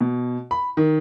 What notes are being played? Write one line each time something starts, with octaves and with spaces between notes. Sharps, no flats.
B2
B5
D#3